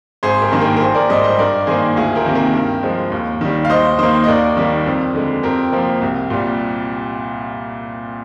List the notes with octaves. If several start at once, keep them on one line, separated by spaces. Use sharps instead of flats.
G#1 G#4 C5
G4 A#4
G2 D#3 A#3
G4 A#4
A#4
A#1 G#4 C5
A#4 D5
G#2 G3 C5 D#5
C5 D#5
G2 A#4 D5
D#3 A#3 G#4 C5
D2 F4 G#4
G4 A#4
C3 D#3 A#3
G4 A#4
G2
F3 G#3
D#2
D#3 G3
F5
D#2 C5 D#5
D#3 A#3 C5 D#5
D#5
D#2 A#4 D5
D#3 G3 A#3
F2
D3 G#3
F2 G4 A#4
C3 F3 A#3
C2
A#2 G3